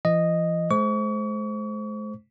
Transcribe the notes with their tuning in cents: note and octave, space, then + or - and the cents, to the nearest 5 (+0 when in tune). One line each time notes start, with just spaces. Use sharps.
E3 +45 D#5 -5
G#3 +45 C5 +0 C#6 +40